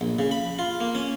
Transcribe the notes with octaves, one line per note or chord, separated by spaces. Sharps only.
A#1
C#3
B5
F4
A#3
C#4